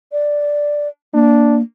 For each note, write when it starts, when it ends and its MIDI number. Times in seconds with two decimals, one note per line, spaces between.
0.12 0.88 74
1.14 1.62 58
1.14 1.59 62